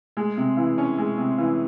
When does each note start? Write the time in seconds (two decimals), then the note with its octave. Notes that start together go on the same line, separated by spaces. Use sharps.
0.17 G#3
0.37 C3
0.57 E3
0.78 C#4
0.98 G#3
1.18 C3
1.38 E3